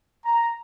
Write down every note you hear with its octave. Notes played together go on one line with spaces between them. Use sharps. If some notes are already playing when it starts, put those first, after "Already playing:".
A#5